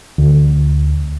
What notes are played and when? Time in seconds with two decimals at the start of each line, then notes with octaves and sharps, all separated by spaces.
0.18 D2